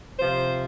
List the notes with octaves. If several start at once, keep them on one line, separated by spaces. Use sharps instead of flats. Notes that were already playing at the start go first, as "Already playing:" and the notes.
C3 F3 C5